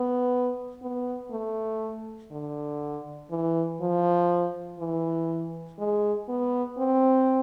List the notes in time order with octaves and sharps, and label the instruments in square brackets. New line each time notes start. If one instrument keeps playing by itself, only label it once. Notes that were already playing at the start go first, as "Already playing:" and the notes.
Already playing: [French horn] B3
B3
A3
D3
E3
F3
E3
G#3
B3
C4